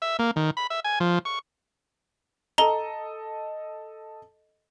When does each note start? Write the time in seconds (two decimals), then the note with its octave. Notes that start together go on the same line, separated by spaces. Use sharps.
0.02 E5
0.19 A#3
0.36 D#3
0.57 B5
0.70 E5
0.84 G#5
1.00 F3
1.25 C#6
2.58 A4 D#5 A#5 G7